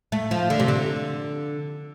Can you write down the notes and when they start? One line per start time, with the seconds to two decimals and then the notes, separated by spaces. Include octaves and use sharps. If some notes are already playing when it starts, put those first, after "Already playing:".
0.12 A3
0.31 F3
0.50 D3
0.60 C3
0.68 D3